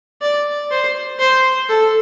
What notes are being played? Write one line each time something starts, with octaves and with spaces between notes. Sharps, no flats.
D5
C5
C5
A4